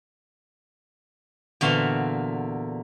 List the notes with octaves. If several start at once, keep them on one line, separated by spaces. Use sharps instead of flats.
E2 A#2 D3 F#4 F5 C6